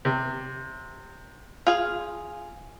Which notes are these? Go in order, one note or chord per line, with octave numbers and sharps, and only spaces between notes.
C3
F4 G#4 F5